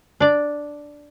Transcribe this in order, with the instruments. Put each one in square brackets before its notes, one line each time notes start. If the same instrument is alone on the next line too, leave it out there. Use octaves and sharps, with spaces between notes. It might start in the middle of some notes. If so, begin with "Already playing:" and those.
[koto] D4 D5